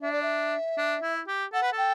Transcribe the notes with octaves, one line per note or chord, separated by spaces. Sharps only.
D4 E5
D5
E5
D4
E4
G4
A4 F#5
B4
A4
G5